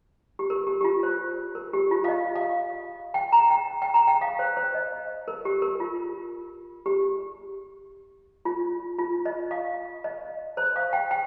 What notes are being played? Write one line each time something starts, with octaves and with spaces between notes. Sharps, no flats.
G4
A#4
G4
G4
F4
C5
A#4
G4
F4
F5
D#5
F5
G5
A#5
G5
G5
A#5
G5
F5
C5
C5
D#5
A#4
G4
A#4
F4
G4
F4
F4
D#5
F5
D#5
C5
F5
G5
G5